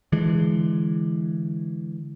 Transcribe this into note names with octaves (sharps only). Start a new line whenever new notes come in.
D3 E3 G#3